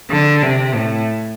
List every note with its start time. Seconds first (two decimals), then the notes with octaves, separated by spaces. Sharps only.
0.10 D3
0.42 C3
0.74 A2